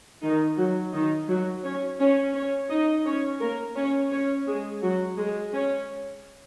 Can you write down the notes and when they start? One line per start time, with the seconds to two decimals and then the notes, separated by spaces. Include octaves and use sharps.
0.22 D#3 D#4
0.58 F#3 F#4
0.93 D#3 D#4
1.28 F#3 F#4
1.64 C#4 C#5
2.00 C#4 C#5
2.34 C#4 C#5
2.70 D#4 D#5
3.06 C#4 C#5
3.41 A#3 A#4
3.76 C#4 C#5
4.12 C#4 C#5
4.47 G#3 G#4
4.82 F#3 F#4
5.18 G#3 G#4
5.53 C#4 C#5